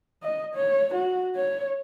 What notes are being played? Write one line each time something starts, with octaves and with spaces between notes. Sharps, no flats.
D#5
C#5
F#4
C#5